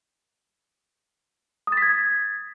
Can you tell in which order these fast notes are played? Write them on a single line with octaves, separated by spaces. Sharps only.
D#6 A6 B6 G#6